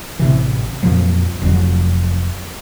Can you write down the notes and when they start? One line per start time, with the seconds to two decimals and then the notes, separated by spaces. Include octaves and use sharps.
0.19 A1 C3 E3
0.83 F2 A#2 F3 F#3
1.42 F1 F2 F#3